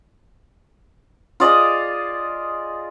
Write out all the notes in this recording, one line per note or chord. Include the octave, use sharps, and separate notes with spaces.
F4 G#4 D5 D#5